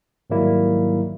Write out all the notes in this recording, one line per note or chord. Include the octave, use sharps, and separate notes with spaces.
G#2 D#3 F#3 G3 A#3 E4